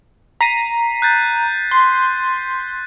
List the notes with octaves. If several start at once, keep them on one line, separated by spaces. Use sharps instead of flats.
A#5 B6 C7 D#7
F#6 G6 A6
C6